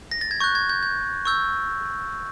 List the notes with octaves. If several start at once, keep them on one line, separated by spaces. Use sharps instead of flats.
A#6
A6
G#6
C#6 F#6 G6
G#6
G6
G6
C#6 E6 G6